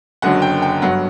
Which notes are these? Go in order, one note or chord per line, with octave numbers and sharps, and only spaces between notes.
F#1 F#2 D3 F#3 F#5
G5
G5
G1 G2 F#3 F#5